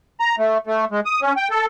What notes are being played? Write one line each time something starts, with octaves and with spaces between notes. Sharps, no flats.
A#5
A3
A3
G#3
D#6
C#4
G5
A4